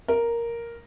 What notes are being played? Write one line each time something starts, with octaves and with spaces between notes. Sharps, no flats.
A#4